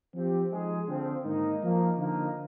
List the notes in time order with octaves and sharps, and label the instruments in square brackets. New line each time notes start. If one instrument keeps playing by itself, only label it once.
[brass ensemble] F3 C4 G4
F3 G#3 D#4 G#4
D3 F3 C4
G#2 D#3 A#3 D#4
F3 A#3 D#4
D3 F3 A#3 D#4